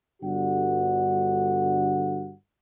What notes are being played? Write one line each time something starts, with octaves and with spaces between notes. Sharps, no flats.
G1 G2 D3 F#4 F#5